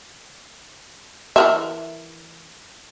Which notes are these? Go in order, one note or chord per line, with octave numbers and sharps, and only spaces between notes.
E3 A#4 E5